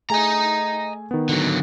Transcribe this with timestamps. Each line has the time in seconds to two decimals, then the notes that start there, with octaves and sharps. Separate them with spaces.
0.10 A3 G#4 D#5 G#5 A#5
1.11 D#3 B3
1.29 D3 F#3